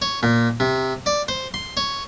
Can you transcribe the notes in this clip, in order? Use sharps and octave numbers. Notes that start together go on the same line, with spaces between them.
C#5
A#2
C3
D5
C5
C6
C#5